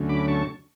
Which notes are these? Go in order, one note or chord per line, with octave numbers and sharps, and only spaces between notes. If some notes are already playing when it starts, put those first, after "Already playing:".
Already playing: D2 D3 F#3 A3 C#4
B5 D6
A5 C#6